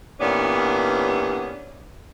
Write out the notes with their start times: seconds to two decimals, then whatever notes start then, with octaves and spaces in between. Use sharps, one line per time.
0.20 G2 A#2 E3 B3 C#4 D4